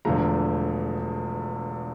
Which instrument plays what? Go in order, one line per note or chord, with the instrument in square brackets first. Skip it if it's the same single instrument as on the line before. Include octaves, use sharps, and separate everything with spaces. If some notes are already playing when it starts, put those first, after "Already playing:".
[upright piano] E1 E2 D3 F3 A3 A#5